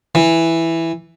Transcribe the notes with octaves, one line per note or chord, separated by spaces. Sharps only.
E3